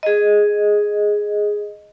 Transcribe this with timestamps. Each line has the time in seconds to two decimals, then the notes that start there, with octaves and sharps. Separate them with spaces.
0.03 G#4 D#5